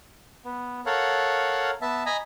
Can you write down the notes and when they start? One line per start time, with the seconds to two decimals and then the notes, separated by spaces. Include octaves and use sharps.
0.45 B3
0.86 A4 A#4 C#5 F5 F#5
1.82 B3 E5 A5
2.06 D#5 G#5 A#5 B5